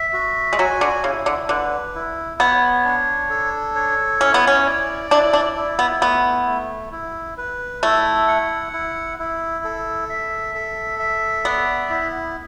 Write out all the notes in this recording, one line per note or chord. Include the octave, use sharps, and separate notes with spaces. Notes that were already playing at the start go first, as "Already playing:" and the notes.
Already playing: E5
F#4
G#3
F#3 G#5
D3
C#3 E4
D3
D3 B4
E4
B3 C#5
D4
A4
C#5
C#4 E4
B3
C#4
D5
D4 E4
D4
E4
B3
A3 B3
A3
E4
B4
A3 E4
F#5
E4
E4
A4
E5
A4
E5
B3 D5
E4